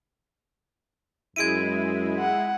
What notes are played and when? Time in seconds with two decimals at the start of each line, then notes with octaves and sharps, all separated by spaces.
1.36 F#2 G#3 E4 G#6 D7 D#7
2.20 F#5